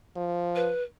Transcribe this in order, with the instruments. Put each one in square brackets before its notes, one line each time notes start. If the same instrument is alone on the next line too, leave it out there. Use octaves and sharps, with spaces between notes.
[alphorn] F3
[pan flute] B4